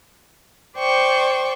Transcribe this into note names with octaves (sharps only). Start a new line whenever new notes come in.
C5 D5 G5 C#6